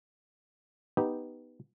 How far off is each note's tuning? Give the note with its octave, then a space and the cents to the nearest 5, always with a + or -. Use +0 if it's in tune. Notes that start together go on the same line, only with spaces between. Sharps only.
B3 +0 D#4 +0 G4 +0